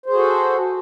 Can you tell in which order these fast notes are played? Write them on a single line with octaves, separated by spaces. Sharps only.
C5 G#4 F#4 A4